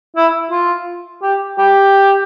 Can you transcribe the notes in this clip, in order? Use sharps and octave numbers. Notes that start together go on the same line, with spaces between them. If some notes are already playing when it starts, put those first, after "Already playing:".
E4
F4
G4
G4